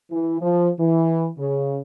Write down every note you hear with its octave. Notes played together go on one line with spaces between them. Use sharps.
E3
F3
E3
C#3